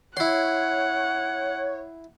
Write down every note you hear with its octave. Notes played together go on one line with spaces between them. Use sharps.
E4 C#5 F#5 C6